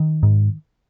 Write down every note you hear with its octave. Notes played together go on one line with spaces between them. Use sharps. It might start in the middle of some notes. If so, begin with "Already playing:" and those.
Already playing: D#3
G#2